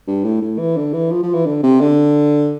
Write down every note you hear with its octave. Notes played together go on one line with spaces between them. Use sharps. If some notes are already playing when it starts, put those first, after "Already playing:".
G2
A2
A2
E3
D3
E3
F3
F3
E3
D3
C3
D3